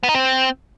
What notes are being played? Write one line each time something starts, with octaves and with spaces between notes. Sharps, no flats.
B3
D#4
C4